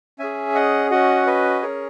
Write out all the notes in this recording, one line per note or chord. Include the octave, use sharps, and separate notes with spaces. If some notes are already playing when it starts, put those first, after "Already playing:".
C#4 G#4 E5 G#5
D#5 F#5
C#4 F#4 D#5 F#5
B4 D#5
C#4 G#4 A#4 C#5